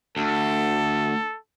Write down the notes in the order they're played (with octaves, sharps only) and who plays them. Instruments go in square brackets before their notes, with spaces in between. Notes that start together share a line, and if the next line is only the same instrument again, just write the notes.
[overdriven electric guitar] D2 [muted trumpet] A4